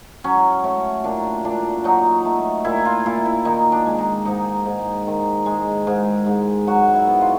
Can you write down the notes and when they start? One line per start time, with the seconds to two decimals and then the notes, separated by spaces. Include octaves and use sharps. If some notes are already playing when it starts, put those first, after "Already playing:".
0.24 F#3 C#4
0.64 A3 C#4
1.04 A#2 D4
1.45 A#2 D4
1.84 F#3 D#4
2.25 A3
2.65 A#2 E4
2.85 F4
3.06 A#2 E4
3.25 E4
3.45 D#3 D#4
3.72 D4
3.86 G#3
3.98 D#4
4.25 G#2 D#4
4.66 G#2
5.07 D#3
5.46 G#3
5.87 G#2
6.26 G#2
6.67 F#3 F#4
6.94 E4
7.07 B3
7.21 F4